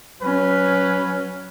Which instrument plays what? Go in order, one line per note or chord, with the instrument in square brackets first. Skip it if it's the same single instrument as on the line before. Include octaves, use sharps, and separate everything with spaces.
[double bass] F#3 C#4 [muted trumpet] B4